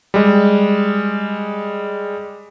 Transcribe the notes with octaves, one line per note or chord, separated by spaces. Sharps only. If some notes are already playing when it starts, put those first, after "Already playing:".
G3 G#3